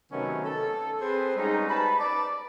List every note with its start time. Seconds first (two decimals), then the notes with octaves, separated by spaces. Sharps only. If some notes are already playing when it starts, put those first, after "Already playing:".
0.12 C3 D#3 F#3 A3 B3 C#4
0.45 A4
1.01 C4 G#4 A4 B4 C5
1.37 G3 G#3 B3 C#4 D#4
1.70 B4 A5 B5
1.99 D5